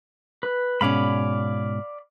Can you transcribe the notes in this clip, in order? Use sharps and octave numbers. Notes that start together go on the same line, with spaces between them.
B4
G#2 B2 C#4 D5 F5 B5